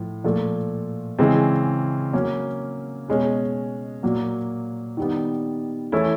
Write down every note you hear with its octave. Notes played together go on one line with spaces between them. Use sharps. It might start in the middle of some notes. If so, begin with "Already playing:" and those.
Already playing: A2 F3
A#2 F3 A3
C#3 E3 G#3 C4
F#3 A#3 C#4
B2 G#3 C#4
A#2 F#3 A#3
D#3 G3 B3
E3 A3 C#4 E4